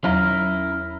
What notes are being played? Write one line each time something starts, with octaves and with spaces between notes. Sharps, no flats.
E2 F#3 C#4 E4 A#4